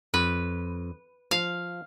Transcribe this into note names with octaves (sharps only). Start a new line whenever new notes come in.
F2 B4
F3 F5